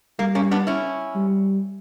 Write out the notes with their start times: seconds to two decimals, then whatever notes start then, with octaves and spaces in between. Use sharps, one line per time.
0.19 G3 A#3
0.35 A#3 C#4
0.51 B3 D4
0.67 C#4 E4
1.15 G3